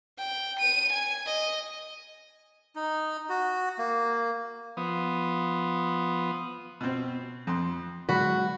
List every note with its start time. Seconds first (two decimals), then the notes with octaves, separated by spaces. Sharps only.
0.19 G5
0.60 D#7
0.93 G#5
1.27 D#5
2.76 D#4
3.29 F#4
3.78 A#3
4.77 F3 B3 D#6
6.81 B2 C4
7.47 F2 C6
8.09 D3 F#3 G#3 F#4 B5